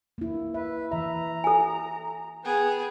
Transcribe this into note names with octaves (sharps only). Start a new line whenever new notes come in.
A#3 E4
B4 E5
E3 E5 A#5
A4 G#5
B3 G#4 G5